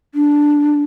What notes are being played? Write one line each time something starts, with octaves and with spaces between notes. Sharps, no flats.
D4